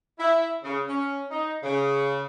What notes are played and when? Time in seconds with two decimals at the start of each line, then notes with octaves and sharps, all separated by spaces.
0.19 E4
0.63 C#3
0.87 C#4
1.30 D#4
1.63 C#3